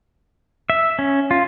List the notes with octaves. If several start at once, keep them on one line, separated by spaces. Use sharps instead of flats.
E5
C#4
F4